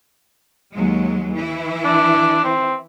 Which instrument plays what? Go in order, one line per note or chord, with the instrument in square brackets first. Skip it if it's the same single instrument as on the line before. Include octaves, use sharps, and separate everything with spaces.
[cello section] D#2 F#3 G#3
E3 E4
[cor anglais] D4
C4